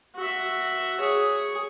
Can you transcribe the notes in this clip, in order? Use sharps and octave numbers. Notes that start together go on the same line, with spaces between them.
F#4 E5
G#4 C#5